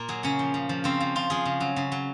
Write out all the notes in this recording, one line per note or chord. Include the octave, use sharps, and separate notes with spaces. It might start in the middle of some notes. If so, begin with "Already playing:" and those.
Already playing: A#2 A#4
F#3 G#4
C#3 C#4
F3
C#3
F3
C#3 C4
F3
C#3 F4
F3 G#4
C#3
F#3
C#3
F#3